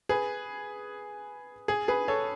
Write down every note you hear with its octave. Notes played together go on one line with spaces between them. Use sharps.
G#4 B4
G#4
G#4 B4
A4 C#5